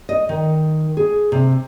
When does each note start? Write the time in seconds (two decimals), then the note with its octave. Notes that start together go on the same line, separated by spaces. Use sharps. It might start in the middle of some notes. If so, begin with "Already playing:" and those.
0.09 D#5
0.29 D#3
0.97 G#4
1.32 C3